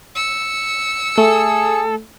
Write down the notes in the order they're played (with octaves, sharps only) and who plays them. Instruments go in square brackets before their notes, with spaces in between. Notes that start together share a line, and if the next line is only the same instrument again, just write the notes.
[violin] E6 C#7
[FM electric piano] A3 [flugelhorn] G#4 [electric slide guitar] A4